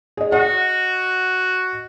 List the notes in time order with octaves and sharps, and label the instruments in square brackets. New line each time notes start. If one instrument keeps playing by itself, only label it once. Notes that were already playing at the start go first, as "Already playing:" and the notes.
[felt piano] G#4 D#5
[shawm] F#4 [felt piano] D#5 F#5